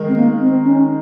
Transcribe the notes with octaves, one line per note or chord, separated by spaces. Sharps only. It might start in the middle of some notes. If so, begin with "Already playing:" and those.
Already playing: D#3 G#3 A#4
C4
A#3
C4
C#4